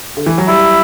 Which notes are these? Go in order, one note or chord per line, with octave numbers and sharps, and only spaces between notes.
D3
E3
F#3
G3 E4